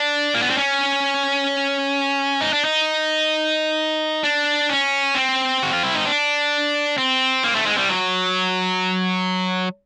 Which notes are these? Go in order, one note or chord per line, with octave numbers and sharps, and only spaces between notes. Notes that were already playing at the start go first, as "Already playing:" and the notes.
Already playing: D4
A#3
B3
C4
C#4
D#4
D4
D#4
D4
C#4
C4
F#4
F4
E4
D#4
D4
C4
A#3
A3
G#3
G3
F#3